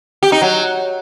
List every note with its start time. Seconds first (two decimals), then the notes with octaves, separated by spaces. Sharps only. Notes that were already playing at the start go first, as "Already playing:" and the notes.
0.23 G4
0.32 D#4
0.42 F#3